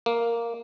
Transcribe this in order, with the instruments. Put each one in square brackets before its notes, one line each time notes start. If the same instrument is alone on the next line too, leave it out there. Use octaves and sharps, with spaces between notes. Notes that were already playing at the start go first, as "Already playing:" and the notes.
[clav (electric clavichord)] A#3